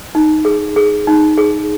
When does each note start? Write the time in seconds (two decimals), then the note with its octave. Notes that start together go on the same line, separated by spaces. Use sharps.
0.15 D#4
0.45 G#4
0.76 G#4
1.07 D#4
1.37 G#4